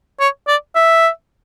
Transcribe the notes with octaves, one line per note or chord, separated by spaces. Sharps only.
C#5
D5
E5